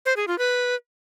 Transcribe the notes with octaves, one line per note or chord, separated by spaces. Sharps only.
C5
G#4
F4
B4